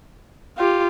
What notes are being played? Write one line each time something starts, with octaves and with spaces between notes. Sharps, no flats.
F4 G4